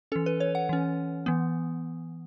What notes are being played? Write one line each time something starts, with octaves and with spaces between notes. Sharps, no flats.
E3 C#4 A4
B4
C#5
F#5
E3 C#4
E3 B3